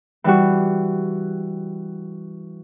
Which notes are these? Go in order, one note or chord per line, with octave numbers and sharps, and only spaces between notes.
E3 G3 F#4